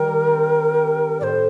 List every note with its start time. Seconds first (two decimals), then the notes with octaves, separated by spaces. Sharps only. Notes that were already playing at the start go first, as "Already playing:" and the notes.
Already playing: D#3 G3 A#4
0.27 C4
0.74 G4
1.20 A2 C5 D5